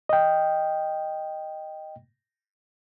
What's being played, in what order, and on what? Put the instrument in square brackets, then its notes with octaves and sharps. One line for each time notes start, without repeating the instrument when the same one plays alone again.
[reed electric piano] D#5 G5